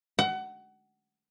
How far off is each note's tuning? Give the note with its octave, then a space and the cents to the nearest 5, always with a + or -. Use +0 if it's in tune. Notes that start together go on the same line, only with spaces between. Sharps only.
F#5 +25